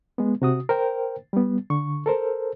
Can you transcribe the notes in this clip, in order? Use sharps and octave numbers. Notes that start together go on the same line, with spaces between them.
G#3 B3
C3 F#4 D#6
A#4 C5 G5
G3 B3
D3 C#6
A4 A#4 C5